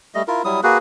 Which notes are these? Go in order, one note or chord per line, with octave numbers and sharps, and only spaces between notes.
G3 A3 D#5
E4 F4 A#4
F#3 G3 E4 D#6
A#3 F#4 G#4 B4